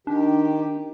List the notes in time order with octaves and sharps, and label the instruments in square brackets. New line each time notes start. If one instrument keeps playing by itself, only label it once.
[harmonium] D#3 G4 [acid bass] D4